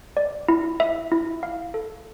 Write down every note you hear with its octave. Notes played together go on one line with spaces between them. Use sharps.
D5
E4
E5
E4
F5
A4